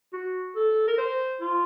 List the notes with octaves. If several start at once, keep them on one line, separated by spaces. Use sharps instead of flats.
F#4
A4
A#4
C5
F4